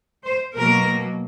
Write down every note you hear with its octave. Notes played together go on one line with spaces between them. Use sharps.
C5
B2 F#3 A#3 A#4